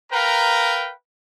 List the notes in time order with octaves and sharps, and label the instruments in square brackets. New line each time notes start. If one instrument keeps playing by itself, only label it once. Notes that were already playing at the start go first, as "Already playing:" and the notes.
[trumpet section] A#4 B4 F5 G5 A#5